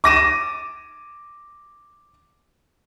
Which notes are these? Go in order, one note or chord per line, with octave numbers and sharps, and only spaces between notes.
D6 A#6 D#7 E7